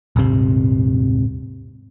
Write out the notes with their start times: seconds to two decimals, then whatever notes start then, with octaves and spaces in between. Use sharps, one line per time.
0.16 D#1 G#1 C3